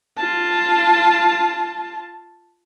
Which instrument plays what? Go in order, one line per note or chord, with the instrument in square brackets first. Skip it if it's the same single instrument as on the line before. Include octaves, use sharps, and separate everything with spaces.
[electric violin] F4 A5